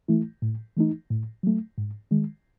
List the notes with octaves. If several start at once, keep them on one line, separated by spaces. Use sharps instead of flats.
E3 A3 E4
A2
E3 A3 D#4
A2
F#3 A3
G#2
D#3 G#3